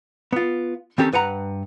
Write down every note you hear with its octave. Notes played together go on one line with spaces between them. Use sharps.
B3 F4
D#3 C4 C#4 G4 A4
G2 B4 F#5 A#5